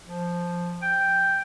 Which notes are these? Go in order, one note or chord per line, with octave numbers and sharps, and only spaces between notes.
F3
G5